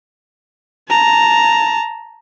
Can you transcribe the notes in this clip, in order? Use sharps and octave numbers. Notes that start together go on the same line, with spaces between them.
A5 A#5